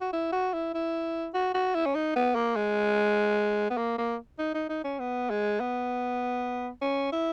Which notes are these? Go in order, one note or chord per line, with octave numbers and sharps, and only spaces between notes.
F#4
E4
F#4
E4
E4
F#4
F#4
E4
C#4
D#4
B3
A#3
G#3
B3
A#3
A#3
D#4
D#4
D#4
C#4
B3
G#3
B3
C#4
E4